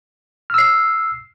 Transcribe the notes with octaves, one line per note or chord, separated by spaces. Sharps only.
E6 F6 C7